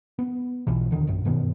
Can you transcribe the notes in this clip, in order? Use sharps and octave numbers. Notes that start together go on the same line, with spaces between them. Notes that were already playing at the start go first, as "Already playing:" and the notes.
B3
B1 B2 E3
D#1 D3 D#3
A#1 F#2
G2 B2 D#3 B3